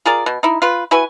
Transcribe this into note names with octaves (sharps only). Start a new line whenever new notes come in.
F4 G#4 A#4 D5
B2
D#4 E4
F4 B4
E4 F#4 B4 G#5